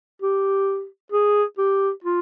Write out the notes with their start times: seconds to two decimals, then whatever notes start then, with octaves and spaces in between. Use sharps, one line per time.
0.22 G4
1.12 G#4
1.58 G4
2.04 F4